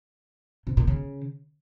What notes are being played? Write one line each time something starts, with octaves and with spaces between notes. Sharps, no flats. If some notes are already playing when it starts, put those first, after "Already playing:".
C3
A#2
C#3